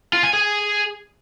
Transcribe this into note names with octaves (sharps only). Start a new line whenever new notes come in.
F4
G#5
G#4